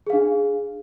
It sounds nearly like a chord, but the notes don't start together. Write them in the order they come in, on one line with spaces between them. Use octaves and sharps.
G#4 F5 D4